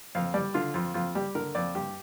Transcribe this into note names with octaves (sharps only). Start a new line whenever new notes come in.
F2 F5
G3 D5
D3 F4
F2 F4
F2 F4
G3 G4
D3 A#4
F2 D5
G2 G4